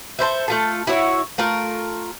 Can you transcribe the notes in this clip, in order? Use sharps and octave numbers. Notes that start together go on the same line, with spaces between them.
A4 B4 C5 E5
A3 F4 A4
E4 F#4 C#5
A3 F4 A#4